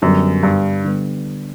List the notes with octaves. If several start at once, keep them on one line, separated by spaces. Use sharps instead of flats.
F#2 D3 G3 B3
G2
D3 G3 B3